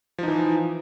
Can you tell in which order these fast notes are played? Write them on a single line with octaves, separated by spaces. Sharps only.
F3 D#4 E3